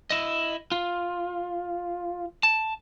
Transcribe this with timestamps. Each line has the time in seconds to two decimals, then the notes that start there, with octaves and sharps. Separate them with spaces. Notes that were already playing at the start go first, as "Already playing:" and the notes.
0.10 E4 D#5
0.72 F4
2.43 A5